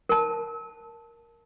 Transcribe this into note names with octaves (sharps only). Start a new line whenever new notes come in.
A#4 A5